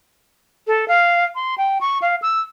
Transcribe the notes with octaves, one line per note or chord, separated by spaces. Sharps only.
A4
F5
C6
G5
C#6
F5
E6